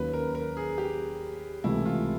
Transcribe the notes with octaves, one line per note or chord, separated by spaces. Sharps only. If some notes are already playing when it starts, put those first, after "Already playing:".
Already playing: D#2 D#3 F#3 A#3 C#4 B4
A#4
A#4
G#4
G4
C#2 C3 E3 A3 E4
F4